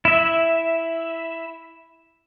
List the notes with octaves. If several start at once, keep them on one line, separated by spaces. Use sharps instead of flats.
E4 E5